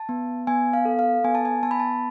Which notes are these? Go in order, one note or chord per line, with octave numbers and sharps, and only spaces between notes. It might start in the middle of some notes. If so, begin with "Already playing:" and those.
Already playing: A5
B3
B3 G#5
F5
A4
F5
B3 G#5
A5
G#5
B3 A5
B5
A5